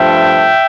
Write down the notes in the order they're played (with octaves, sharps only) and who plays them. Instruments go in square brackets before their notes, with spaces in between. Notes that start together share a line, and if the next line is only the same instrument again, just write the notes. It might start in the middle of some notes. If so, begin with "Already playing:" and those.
Already playing: [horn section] G2 F3 A3 E5 G5